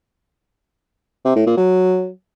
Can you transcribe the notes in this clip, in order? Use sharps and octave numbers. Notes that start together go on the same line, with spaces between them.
C3
A2
A#2
F#3